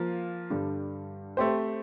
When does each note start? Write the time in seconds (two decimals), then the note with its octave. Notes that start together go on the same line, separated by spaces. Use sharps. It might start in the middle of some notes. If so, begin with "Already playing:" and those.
Already playing: F3 A#3 F4
0.50 G2 D3 G3
1.37 A3 C4 G4 C5